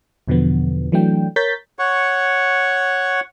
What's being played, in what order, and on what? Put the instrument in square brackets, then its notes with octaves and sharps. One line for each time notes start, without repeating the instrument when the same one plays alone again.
[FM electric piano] E2 B2 D3 F3 B3
E3 F#3 A3 D4 G5
A#4 C#5 G6 A6 B6
[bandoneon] C#5 F#5 C#6